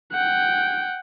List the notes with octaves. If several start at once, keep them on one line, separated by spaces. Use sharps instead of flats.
F#5 G5